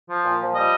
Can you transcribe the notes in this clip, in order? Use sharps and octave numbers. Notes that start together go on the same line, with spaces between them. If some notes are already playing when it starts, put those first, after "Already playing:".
F3
A#2
F3
G3 D#5